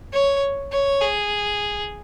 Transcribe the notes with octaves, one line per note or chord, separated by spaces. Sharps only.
C#5
C#5
G#4